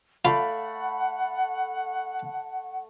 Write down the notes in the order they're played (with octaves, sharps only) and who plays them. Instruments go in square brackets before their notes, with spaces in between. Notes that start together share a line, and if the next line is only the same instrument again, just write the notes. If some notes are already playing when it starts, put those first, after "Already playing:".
[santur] A3 B5 [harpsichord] F4 [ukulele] D5 F5 [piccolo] F#5